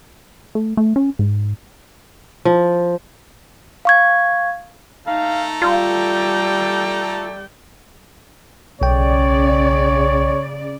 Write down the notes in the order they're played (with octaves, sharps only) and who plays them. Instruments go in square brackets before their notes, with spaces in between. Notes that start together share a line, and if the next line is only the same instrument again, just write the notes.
[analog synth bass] A3
A3
C#4
G#2
[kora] F3
[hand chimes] F5 C#6 G#6
[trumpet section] A3 A4 A#5 [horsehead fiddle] D#4 [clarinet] F5
[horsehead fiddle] G3 G5 [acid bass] F4 [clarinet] D5
[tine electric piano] B1 G5 [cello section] C#3 D5 [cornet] C#5